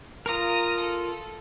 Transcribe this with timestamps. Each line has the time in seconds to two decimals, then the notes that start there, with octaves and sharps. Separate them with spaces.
0.26 F4 A#4 A#5 D#6
0.80 A4